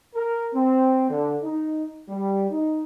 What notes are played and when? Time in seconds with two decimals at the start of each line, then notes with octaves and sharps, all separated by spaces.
0.15 A#4
0.53 C4
1.09 D3
1.43 D#4
2.08 G3
2.50 D#4